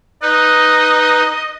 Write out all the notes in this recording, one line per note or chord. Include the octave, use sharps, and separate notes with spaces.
D#4 B4 D#5